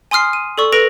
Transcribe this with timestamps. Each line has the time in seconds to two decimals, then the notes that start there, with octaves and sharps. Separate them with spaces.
0.11 G#5 C6 D#6 F6 C7
0.33 D#7
0.58 A4 D5 C#6 E6
0.73 A4 B4 A#6 D7 F7